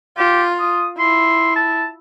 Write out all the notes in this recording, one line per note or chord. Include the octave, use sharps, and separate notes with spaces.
F4 G4
D#6
E4 C6
A5